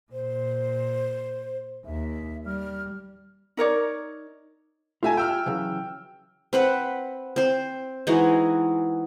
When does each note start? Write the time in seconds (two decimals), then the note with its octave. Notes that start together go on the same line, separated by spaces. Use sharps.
0.12 A#2 C5
1.86 D#2 E5
2.46 G3 F6
3.57 D#4 A#4 C#5 D5
5.03 A3 F4 G4 E5 G#5 A#5
5.17 G5 E6 F6
5.46 C#3 E3 F#3
6.53 C4 B4 F#5
7.36 C4 C5
8.07 E3 G#3 D#4 F#4